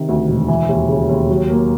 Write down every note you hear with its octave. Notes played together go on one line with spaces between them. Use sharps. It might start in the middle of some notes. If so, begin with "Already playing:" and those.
Already playing: C3 D#3
D2
E1
E3
D#2
C#3
D#2
F#3
A#3